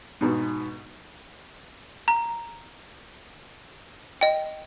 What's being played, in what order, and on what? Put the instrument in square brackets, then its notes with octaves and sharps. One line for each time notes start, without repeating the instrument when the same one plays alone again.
[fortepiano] G#2 B2
[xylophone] A#5
D#5 G5